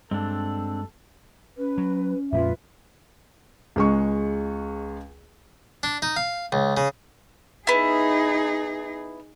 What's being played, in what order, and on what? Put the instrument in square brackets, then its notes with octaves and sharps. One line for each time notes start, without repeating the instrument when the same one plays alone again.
[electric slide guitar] G2 [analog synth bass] G#3 [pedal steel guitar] C4 D4 [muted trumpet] A4
[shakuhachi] C#4 [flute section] B4
[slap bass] F#3
[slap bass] F2 A#2 G#3 [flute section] F4 B4 E5
[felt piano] C#2 G#3 C#6
[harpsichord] D4
D#4
F5
C#2
C#3
[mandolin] B3 E4 [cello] D#4 G#4